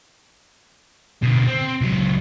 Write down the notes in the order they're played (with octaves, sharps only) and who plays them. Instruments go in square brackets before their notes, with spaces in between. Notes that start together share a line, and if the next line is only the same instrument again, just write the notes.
[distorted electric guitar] B2 D3
C4
C#2 F#3